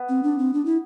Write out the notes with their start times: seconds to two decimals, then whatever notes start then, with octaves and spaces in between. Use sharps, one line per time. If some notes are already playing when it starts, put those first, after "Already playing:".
Already playing: B3
0.09 C4
0.23 D4
0.38 C4
0.54 D4
0.65 E4